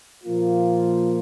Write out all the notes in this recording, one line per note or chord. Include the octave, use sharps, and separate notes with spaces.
A#2 F3 A#3 F4